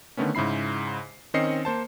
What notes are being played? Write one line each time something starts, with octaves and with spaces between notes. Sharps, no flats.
D3 D#3 A3 B3 C#4
G#2 C#3 E4 B5 C7
D#3 C4 C#4 D#5 C7 C#7
A#3 C5 A5